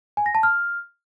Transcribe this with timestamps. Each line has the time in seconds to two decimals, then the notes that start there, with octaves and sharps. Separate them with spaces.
0.17 G#5
0.26 A#6
0.35 A5
0.43 F6